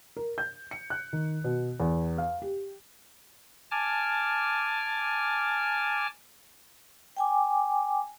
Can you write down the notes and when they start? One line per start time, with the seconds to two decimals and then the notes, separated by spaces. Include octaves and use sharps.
0.16 A#4
0.38 G6
0.71 C#7
0.90 F#6
1.13 D#3
1.44 B2
1.80 E2
2.18 F5
2.42 G4
3.71 G#5 A5 D6 F6
7.17 G5 G#5 D6